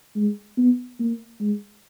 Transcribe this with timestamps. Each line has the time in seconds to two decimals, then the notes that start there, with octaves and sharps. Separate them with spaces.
0.16 G#3
0.58 B3
1.00 A#3
1.40 G#3